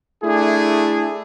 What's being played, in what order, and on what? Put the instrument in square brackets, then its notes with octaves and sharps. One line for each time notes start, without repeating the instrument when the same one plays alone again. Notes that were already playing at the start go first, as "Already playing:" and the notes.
[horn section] A3 D4 E4 G#4